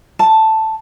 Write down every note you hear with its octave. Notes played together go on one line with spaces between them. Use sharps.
A5